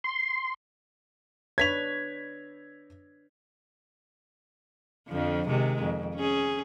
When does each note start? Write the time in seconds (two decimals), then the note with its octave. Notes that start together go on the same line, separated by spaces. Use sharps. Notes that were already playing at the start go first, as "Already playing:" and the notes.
0.04 C6
1.58 D4 B4 C#5 G#6 B6 F7
5.08 F2 D3 F3
5.47 C3 D#3 G#3
5.83 F2
6.15 C#4 G#4